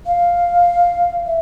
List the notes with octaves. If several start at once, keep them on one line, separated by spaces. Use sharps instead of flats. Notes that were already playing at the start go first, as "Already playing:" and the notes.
F5
E5